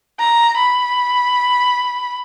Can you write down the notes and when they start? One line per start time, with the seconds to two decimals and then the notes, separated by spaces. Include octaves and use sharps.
0.20 A#5
0.58 B5